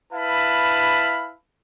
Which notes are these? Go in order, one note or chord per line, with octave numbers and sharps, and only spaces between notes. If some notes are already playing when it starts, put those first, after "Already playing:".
E4 B4 F5 A5 B5